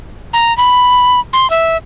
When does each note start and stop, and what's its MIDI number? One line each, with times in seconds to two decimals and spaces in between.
0.33 0.55 82
0.57 1.20 83
1.33 1.50 84
1.50 1.77 76